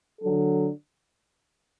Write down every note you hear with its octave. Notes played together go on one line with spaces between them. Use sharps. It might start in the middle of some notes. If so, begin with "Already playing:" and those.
D3 F#3 D4 A4